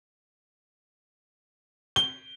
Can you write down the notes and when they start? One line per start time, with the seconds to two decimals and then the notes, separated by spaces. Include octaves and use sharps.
1.96 G7